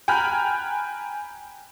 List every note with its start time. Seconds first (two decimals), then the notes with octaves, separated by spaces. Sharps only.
0.08 G5 G#5 A#5 B5 F6 F#6